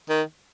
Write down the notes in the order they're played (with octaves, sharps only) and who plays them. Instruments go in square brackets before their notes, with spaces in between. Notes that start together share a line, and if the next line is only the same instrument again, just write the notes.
[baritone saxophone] D#3